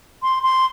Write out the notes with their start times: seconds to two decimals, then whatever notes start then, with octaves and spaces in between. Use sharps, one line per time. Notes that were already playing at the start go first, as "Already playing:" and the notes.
0.23 C6
0.43 C6